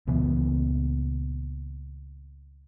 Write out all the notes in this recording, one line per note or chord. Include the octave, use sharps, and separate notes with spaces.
C#2 A#2 E3 B3